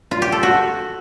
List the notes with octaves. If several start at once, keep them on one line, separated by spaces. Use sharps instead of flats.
F4
G4
A4
F#4